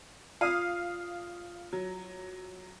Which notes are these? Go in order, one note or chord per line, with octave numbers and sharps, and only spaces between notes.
F4 D5 F5 D#6 C7 D#7
F#3